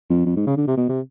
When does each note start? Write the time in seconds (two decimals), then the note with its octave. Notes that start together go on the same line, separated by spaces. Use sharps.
0.10 F2
0.26 F2
0.36 G#2
0.47 C#3
0.57 D3
0.68 C3
0.77 B2
0.89 C3